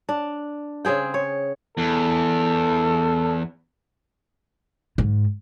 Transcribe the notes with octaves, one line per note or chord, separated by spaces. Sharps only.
D4
C#3 C4 G#4 G5
C#5
E2 A4
G#2